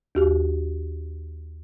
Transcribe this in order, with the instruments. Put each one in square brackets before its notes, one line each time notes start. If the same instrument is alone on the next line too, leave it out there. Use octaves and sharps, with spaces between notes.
[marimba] D#2 F#4 G4